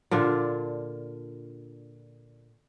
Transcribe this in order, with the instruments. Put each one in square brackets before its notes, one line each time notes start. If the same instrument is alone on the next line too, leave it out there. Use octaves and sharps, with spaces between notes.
[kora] A#2 D3 D4 F4